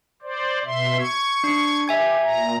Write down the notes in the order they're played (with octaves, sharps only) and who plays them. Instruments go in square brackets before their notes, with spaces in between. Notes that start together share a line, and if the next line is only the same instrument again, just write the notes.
[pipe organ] C5 D5
B2 E5 C6
C#6 G#6
[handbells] D4
[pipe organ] G4 [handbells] E5 G#5 G#6
[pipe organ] A#2 A#5